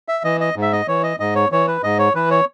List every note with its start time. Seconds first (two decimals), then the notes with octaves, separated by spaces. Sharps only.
0.09 E5
0.24 E3 D#5
0.41 D#5
0.56 G#2
0.62 E5
0.73 D#5
0.88 E3 C#5
1.03 D#5
1.20 G#2 D#5
1.35 C#5
1.52 E3 C#5
1.67 B4
1.83 G#2 D#5
1.99 C#5
2.15 E3 B4
2.31 C#5